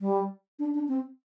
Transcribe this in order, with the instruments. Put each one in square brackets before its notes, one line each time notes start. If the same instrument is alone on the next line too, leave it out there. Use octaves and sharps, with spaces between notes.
[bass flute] G3
D4
D4
C4